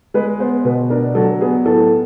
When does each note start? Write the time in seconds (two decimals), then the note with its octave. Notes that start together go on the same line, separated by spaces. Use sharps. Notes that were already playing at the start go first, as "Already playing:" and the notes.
0.14 G#3 B4
0.39 B3 C5
0.65 B2 B4
0.90 D4 A#4
1.15 F#3 A4
1.41 B3 G#4
1.66 A2 A4